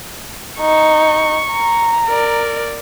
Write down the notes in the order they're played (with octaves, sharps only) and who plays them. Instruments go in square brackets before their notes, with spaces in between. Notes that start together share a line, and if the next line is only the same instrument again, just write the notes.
[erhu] D#4 [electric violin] C#6
[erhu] A#5
[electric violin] A#4 D5